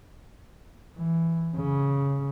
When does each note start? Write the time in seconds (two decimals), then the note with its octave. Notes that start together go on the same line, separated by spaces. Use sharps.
0.97 E3
1.55 C#3